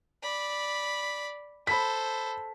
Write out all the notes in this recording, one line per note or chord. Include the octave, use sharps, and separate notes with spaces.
D5 B5
A4 C5 B5 B6